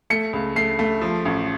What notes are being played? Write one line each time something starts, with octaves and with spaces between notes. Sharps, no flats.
A3 C#7
C#2
A3 C7
A3
F3
A1